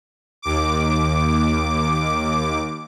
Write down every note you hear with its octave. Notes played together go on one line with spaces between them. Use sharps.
D#2 D6